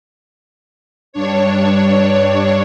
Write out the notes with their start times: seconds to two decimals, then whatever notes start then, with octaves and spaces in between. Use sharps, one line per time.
1.13 G2 D4 C#5